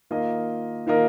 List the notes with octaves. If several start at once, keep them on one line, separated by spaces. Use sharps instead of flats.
D#3 A#3 F4 A#4 D#5
D#3 A#3 F4 A#4 D#5